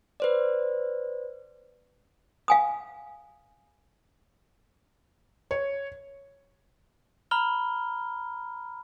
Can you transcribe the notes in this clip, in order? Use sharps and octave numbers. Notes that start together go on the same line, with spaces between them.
B4 C5 D5
F5 G#5 D#6
C#5
A#5 B5 F6 G7